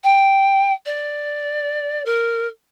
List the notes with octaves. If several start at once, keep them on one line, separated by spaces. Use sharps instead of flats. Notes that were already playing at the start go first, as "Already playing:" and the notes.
G5
D5
A#4